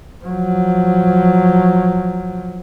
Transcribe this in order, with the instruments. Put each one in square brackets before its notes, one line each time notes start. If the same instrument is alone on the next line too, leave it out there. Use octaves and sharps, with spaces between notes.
[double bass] F3 F#3